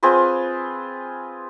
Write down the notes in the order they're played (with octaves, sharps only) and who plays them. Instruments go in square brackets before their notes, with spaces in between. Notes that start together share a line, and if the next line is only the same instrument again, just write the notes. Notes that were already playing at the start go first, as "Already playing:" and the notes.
[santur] C4 F4 G#4 B4